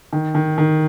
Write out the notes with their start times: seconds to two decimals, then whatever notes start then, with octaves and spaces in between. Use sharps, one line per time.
0.13 D#3
0.35 D#3
0.58 D#3